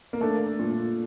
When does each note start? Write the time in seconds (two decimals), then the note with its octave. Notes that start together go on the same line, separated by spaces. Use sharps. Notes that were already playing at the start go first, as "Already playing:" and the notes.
0.13 A#3
0.21 A3 D4
0.59 A#2